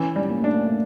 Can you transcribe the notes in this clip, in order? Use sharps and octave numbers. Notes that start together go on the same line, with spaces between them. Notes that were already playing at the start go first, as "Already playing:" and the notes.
Already playing: E3 C#4
G3
A#3
A3 D4
A#3
A3